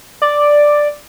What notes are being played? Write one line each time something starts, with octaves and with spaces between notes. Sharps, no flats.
D5